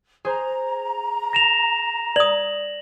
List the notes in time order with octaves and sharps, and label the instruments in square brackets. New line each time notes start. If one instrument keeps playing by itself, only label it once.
[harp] G#4 C5 [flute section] A#5
[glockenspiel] A#6 E7 F7
[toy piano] D5 D#6 [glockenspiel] F#7